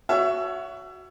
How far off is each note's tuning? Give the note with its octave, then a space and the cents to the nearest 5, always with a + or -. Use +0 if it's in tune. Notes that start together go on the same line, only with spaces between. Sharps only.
F#4 +0 C#5 +25 E5 +25